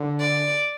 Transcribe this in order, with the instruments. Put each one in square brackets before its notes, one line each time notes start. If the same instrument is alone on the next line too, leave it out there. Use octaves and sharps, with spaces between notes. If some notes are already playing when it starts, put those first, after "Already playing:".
Already playing: [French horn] D3
[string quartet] D5